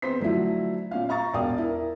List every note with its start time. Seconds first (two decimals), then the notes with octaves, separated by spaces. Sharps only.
0.02 E2 C4 B4 C5 B6
0.20 D3 F3 F#3 A3 E4
0.91 A#2 C#4 F5
1.09 F5 A#5 C#6 A6
1.34 E1 D5 F5 G5 D#6
1.58 E4 A#4